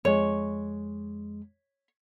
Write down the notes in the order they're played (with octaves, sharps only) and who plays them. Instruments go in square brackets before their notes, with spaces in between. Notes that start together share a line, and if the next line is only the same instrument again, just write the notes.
[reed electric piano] F2 G#3 [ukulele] C#5